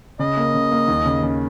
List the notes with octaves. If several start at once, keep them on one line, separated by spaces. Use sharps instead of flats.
C#3 D#5
A#3
C#3
A#3
D#2
C#3
C#3